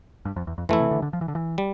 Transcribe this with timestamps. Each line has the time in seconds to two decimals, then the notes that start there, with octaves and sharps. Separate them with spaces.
0.25 G2
0.36 F2
0.47 E2
0.58 F2
0.69 F2 E3 A3 E4
0.80 C3
0.91 D3
1.02 D3
1.13 F3
1.21 E3
1.28 D3
1.35 E3
1.58 G3